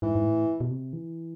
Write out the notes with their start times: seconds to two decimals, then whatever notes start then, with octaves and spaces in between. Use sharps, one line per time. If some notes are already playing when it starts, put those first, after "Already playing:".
0.02 G#2 E3
0.15 G#2
0.25 A2
0.61 B2
0.71 C3
0.93 E3